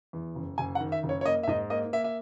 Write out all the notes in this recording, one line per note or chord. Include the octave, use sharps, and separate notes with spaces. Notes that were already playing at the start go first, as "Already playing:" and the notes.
E2
F#1
F#1 G#5
F#5
D#3
E5
F#1
C#5
C#5
A#3 D#5
E5
G#2 D#5
A#3 D#5
A#3 E5
E5